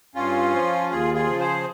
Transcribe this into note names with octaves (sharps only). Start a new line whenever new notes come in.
G2 C#4 F4
F3
D#2 F4 G#4
F4 G#4
C#3 F3
G#4 C5